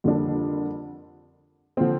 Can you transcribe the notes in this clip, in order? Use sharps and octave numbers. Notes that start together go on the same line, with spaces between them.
F2 D3 G3 A#3 D4
D3 F3 C4